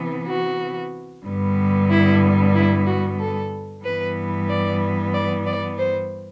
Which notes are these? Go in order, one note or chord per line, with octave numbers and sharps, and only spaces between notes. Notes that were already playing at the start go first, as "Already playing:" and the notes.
Already playing: C3 E3 B3
F#4
G2 D3 G3 B3
E4
E4
F#4
A4
G2 E3 G3 B3 B4
D5
D5
D5
C5